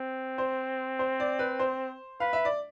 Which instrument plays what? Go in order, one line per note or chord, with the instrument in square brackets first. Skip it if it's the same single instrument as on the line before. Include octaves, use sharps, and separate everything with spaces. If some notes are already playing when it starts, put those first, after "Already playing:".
Already playing: [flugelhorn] C4
[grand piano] C5
C5
D5
B4
C5
[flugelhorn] B4 [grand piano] F5
[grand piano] E5
D5